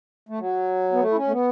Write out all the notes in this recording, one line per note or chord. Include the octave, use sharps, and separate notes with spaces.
A3
F#3
B3
A3
E4
C#4
A3
B3